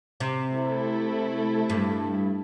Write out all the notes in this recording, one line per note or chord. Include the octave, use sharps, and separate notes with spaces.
C3
A3 E4 A4
G2